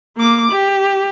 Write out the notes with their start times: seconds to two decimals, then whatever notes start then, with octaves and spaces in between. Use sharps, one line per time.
0.17 A#3 D6
0.52 G4